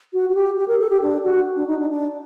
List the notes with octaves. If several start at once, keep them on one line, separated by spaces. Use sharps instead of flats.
F#4
F#4
G4
G4
A#4
A4
G4
D4
F#4
D4
D#4
D4
D4